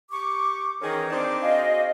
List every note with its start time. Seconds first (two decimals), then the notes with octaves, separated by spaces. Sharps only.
0.12 G4 C#6 D6
0.82 D#3 E3 C#4 D#4 G#4 A#4
1.10 C4 D4 D#4 C5 D6
1.42 F#4 G#4 D#5 F5